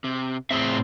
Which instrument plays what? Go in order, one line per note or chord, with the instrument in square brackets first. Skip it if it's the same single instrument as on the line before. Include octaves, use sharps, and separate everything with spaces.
[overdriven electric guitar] C3
[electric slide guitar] A2 G#4 E5 [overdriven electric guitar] C4